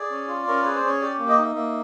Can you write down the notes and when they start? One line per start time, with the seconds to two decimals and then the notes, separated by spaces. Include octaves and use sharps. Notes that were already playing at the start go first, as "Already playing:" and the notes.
Already playing: G#4 D5
0.10 C#4
0.28 F4
0.47 C#4 A#4
0.62 G#4 B4
0.75 C5
0.83 C#4 C#5
1.01 G4 D5
1.19 A#3
1.28 D#5
1.38 D#4 E5
1.55 A#3 E5